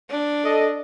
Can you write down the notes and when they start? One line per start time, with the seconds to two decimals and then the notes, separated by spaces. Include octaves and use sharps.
0.10 D4
0.45 A4 D#5